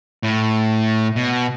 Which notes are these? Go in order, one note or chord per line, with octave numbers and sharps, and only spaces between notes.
A2
B2